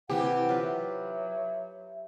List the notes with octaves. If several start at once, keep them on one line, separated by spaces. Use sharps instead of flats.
C3 E3 G4 F#5 G5
F#3 F4 B4
E5